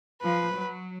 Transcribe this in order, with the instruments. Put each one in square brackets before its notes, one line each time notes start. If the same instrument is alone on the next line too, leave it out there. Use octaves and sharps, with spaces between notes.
[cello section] F3 [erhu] B4
[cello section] F#3